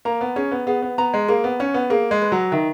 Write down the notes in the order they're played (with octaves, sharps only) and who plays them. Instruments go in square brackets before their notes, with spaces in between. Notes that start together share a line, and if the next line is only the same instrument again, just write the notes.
[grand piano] A#3 [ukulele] A#5
[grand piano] B3
[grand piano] C#4 [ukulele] G#4
[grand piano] B3
[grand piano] B3 [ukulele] G#4
[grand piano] B3
[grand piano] B3 [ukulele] A#5
[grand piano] G#3
[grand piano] A#3 [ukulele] G#4
[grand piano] B3
[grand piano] C#4 [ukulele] F#5
[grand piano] B3
[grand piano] A#3 [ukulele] G#4
[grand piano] G#3
[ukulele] B4
[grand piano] F#3
[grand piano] D#3 [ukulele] E5